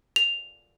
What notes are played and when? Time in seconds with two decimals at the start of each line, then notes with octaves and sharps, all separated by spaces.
0.16 F7